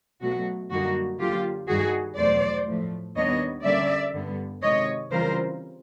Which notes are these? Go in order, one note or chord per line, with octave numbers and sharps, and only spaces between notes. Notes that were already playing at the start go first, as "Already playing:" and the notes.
B2 F#3 A3 F#4
F#2 D3 G3 A#3 D#4 F#4
D3 F#3 A#3 F4 G4
G2 D#3 G3 F#4 G#4
E2 B2 F#3 A3 C5 D5
A2 F3 A3
D#2 D#3 G3 B3 D4 C#5 D#5
D3 G3 A#3 C#4 D5 E5
G2 D3 G3 B3
C3 D#3 G#3 C#5 D#5
C#3 E3 G3 C4 F4 A#4 C5